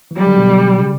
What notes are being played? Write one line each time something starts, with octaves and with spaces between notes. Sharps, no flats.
E3
F#3 G3
D3
B2
B2
C#3